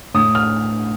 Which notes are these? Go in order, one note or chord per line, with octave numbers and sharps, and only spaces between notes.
A2 D#6
F6